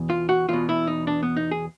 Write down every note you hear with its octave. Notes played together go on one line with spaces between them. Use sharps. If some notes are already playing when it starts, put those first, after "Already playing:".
Already playing: E2 B2
F4
F#4
E2 B2 F4
E4
D#4
D4
B3
D#4
G#4